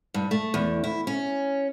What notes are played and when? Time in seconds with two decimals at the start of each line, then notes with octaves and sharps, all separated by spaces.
0.14 G2
0.31 A3
0.54 E2
0.84 E4
1.07 C#4